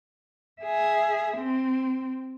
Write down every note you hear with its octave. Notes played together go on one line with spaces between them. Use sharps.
G#4 E5
C4